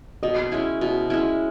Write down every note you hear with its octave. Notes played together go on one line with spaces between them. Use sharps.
B2 D#5
G#3 C#4 E4
B2
G#3 C#4 E4